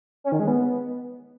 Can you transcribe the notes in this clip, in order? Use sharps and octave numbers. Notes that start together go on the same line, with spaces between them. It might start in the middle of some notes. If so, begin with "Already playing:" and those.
C#4
D#3
G#3
B3